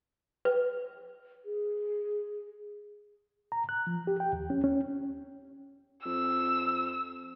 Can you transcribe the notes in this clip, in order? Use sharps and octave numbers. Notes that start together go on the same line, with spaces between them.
B4
G#4
A#5
F#6
F3
G4
G5
D#2
C#4
C#4
F2 E6